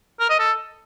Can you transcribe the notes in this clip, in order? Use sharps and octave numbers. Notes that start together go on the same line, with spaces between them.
A#4
D#5
A4